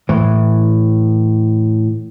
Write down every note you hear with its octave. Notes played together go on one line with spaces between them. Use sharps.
A2 E3